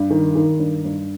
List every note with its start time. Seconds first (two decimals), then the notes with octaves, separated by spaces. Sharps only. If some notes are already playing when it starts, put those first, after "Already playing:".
Already playing: G2
0.10 D#3
0.35 D#3
0.60 G2
0.85 G2